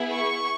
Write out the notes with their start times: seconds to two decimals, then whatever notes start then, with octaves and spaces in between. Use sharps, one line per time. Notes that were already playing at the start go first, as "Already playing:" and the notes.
Already playing: B3 E4 G#4
0.13 C#6